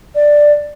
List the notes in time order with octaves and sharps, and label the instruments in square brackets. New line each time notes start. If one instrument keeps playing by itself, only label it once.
[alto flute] D5